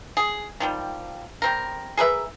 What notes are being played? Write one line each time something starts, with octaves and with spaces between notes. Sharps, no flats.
G#4
D#3 F3 G3
G3 C4 A#4
G#4 A#4 B4 E5